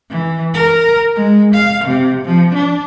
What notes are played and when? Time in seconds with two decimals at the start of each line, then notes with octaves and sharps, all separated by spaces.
0.10 E3
0.54 A#4
1.16 G#3
1.55 F5
1.85 C3
2.25 F3
2.54 D4